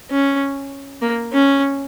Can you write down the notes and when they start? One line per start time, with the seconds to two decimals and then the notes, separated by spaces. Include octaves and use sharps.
0.10 C#4
1.02 A#3
1.33 C#4